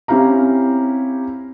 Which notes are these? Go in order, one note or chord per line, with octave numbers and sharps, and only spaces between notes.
C4 C#4 E4 G4 F5 A#5